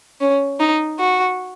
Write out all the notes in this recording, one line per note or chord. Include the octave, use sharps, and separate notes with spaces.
C#4
D#4
F#4